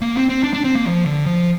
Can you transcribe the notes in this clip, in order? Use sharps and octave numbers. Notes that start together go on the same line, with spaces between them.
A#3
C4
C4
D4
D4
C4
A#3
F3
D3
F3